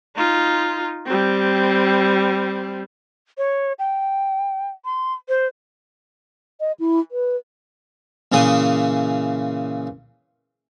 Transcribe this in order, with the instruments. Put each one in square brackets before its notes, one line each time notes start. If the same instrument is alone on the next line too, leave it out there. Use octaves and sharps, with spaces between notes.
[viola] D#4 F4
G3 C4
[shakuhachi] C#5
G5
C6
C5
[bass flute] D#5
E4
B4
[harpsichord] A#2 C#3 E3 G#4 D#6